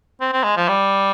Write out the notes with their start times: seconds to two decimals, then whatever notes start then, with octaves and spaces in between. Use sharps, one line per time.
0.21 C4
0.33 C4
0.44 G#3
0.57 F3
0.69 G3